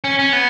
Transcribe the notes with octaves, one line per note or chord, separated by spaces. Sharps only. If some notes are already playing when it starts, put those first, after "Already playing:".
C#4
C#4
B3